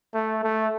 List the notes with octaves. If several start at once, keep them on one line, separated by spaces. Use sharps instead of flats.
A3
A3